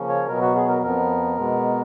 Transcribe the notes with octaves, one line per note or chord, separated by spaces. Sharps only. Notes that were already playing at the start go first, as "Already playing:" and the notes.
Already playing: C#3 F3 A#3 C#4
C#5
B2 F#3 B3 A#4
F#4
G#4
A#4
F2 F3 B3 A#4
B2 G#3 B3